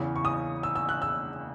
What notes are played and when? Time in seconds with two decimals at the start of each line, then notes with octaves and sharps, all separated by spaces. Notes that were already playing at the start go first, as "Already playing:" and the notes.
Already playing: E2 C#3 E3
0.16 C#6
0.25 D#6
0.63 E6
0.76 E6
0.89 F#6
1.02 E6